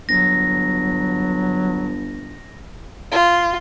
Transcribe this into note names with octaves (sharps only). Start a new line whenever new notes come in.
G1 F#3 A#6
F4